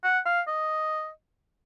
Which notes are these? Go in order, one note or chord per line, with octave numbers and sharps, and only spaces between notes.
F#5
F5
D#5